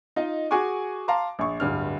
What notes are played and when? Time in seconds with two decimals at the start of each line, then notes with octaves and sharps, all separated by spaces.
0.16 D#4 F4 D#5
0.51 F#4 G#4 G#5 C#6 D6
1.08 F5 A5 A#5 C6 D6
1.39 A#1 C#6
1.60 D1 G2 F6